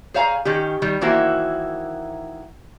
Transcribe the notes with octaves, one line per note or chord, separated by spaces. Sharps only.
G#4 C5 C#5 F5 G#5 A#5
D#3 C#4 G4
D#3 G3
D#3 E3 A#3 E4 F#4 C5